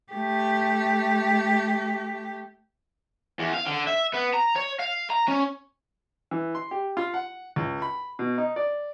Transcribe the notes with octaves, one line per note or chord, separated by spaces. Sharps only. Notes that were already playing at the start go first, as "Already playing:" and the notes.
A3 G4
E2
F5
D3
E5
B3
A#5
C#5
F5
A#5
C#4
E3
C6
G4
F4
F#5
C#2
B5
B2
D#4
D5